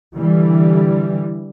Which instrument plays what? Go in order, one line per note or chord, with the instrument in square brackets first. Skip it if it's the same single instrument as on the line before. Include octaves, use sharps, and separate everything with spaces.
[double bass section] D3 E3 G3